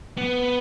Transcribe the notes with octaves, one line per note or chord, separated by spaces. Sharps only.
B3